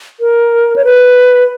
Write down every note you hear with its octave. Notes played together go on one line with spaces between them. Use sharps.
A#4
C#5
B4